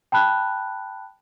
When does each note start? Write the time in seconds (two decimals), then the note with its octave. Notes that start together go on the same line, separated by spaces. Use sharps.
0.12 G5 A5 B5 F#6